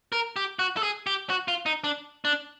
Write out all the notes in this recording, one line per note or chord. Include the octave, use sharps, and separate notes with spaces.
A#4
G4
F#4
A4
G#4
G4
F#4
F4
D#4
D4
D4